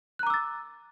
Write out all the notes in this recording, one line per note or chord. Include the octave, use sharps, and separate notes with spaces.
A#5 D6 E6 F#6 A6